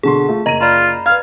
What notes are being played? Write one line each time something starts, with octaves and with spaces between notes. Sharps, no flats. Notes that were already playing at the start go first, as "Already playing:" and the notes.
B2 D3 G#4 C6
A3 F4
F#1 D#5 A#5 A#6 D#7
F4 D5 A#5 B5
B4 F5 G#6